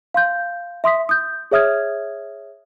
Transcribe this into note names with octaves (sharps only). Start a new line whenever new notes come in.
F5 C6 G6
E5 C6 D#6 B6
D#6 G6
G#4 C#5 E5 D#6 F6 G#6